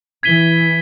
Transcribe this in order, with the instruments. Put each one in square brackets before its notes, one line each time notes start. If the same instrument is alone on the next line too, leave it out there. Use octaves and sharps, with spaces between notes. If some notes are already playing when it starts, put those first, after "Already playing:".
[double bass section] E3 [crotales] G#6 B6 D#7 G7